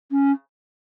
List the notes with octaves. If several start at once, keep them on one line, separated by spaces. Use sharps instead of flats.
C#4